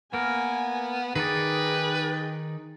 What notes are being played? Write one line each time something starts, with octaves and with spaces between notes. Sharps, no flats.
A#3 B3 A#4 G#5
D#3 D#4 G#4 B4 D5 G5